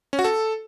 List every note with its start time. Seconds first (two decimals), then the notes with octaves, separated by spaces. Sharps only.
0.13 C#4
0.19 F#4
0.24 A4